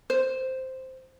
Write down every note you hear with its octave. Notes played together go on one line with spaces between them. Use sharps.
C5